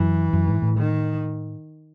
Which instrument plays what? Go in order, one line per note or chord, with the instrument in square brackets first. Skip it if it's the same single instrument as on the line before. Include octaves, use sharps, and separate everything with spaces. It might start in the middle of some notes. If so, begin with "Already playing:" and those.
Already playing: [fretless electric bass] F#2 [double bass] E3
[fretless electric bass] F#2
G#2
A2
[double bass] D#3